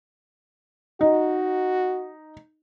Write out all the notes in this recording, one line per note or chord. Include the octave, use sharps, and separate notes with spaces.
D#4 F#4